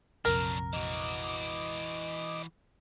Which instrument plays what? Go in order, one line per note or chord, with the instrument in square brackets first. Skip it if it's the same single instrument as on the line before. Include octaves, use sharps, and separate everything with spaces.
[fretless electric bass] A#1 F2 C3 [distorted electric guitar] F#3 D4 [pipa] A#4
[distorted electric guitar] E3 F#4 [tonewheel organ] D#5 D6